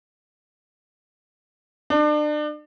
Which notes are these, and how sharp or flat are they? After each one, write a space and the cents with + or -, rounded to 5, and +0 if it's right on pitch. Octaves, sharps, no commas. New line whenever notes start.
D4 +35